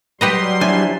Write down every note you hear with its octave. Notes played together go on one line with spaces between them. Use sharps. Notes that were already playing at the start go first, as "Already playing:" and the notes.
F#3 G3 G4 B4 D#5 C6
F3 D4 E4 G#5